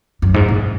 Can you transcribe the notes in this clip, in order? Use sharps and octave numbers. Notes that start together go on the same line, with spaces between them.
F#2
G#2
A#2